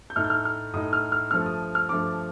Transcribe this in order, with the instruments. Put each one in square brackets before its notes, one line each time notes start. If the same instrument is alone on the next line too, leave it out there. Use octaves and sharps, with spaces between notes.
[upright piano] G6
A2 A3 D#4 F6
G6
F6
F6
A2 A3 D#4 D#6
F6
F6
G2 F3 A3 F6
D#6
F6
G2 F3 A3 D6